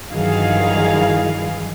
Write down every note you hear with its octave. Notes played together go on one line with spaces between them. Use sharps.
G2 D#3 E3 F#3 G#4 F5